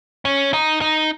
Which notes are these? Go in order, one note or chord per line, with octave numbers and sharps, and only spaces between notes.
C#4
D#4
D#4